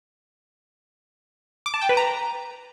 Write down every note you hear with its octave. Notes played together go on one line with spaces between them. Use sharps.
D6
A5
G5
B4
A#5